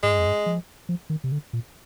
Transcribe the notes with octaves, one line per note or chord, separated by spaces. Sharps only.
G#2 G#3
G2
F2
G2
F3
F3
D#3
C3
D3
A#2